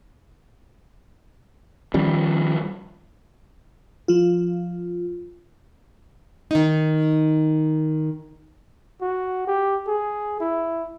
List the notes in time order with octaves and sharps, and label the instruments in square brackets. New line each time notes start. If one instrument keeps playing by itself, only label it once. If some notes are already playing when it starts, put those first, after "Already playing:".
[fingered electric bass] D#3 F3 G3 C#4
[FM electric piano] F3 F4
[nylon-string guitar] D#3 D#4
[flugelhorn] F#4
G4
G#4
E4